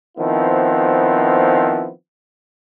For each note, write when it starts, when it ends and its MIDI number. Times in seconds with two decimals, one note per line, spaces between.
0.18 1.89 51
0.18 1.89 53
0.18 1.89 59
0.18 1.89 60
0.18 1.89 64